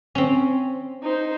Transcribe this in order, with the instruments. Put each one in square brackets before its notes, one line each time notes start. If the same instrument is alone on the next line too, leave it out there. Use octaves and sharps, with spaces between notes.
[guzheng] C4 C#4
[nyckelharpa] D#4 C5